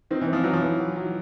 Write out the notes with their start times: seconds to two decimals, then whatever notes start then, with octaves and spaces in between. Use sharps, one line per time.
0.11 D#3 C4
0.21 E3
0.28 F3 C4
0.44 E3 F#3
0.53 F3
0.62 E3
0.80 F#3
0.97 F#3